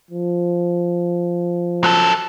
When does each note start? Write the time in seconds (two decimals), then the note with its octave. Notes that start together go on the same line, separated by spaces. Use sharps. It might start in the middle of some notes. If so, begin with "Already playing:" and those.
0.11 F3
1.84 F#3 A4